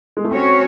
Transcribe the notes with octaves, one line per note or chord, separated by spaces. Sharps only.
G#3
A3
F#3 C4 C#4 F#4 C#5